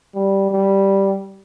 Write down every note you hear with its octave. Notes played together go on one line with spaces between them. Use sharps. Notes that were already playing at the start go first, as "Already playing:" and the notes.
G3
G3